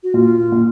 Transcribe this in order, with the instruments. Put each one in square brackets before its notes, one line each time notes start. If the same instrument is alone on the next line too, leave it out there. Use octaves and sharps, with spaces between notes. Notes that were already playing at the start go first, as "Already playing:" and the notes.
[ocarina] F#4
[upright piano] A#2 [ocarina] F4
[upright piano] A#2